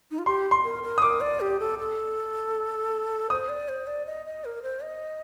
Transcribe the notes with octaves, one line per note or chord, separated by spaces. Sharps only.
D#4
F4
G4 C6
C6
A#4
A#4
D#6
A#4 D6
D5
G4
A4
A4
C5 D#6
D5
C5
D5
D#5
D#5
A#4
C5
D#5